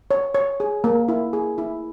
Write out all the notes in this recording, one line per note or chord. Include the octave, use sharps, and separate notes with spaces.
C#5
C#5
G#4
A#3
E4
G#4
E4